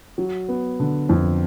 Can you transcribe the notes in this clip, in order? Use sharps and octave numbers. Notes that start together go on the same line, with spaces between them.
F#3
B3
D3
F2